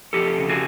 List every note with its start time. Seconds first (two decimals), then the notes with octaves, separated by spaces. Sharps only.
0.13 F2 G4 A4
0.38 C#3
0.49 F#4 G#4